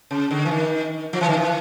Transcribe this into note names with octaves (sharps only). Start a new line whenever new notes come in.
C#3
D3
E3
D#3
F3
E3
D#3
E3